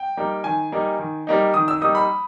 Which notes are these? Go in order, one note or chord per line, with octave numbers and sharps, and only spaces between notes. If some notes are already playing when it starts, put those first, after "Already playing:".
Already playing: G5
G3 A#3 D#4
D#3 G#5
G3 A#3 D#4
D#3
G3 A#3 D#4
D#3 D#6
E6
G3 A#3 D#4 D#6
B5